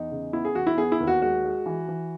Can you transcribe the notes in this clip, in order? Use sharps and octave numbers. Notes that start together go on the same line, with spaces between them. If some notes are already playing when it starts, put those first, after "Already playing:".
Already playing: E2 D#4
C#3
B3 E4
G#4
E2 F#4
E4
B3 G#4
E4
D#2
F#4
G#3 F#4
G#3
E3
E3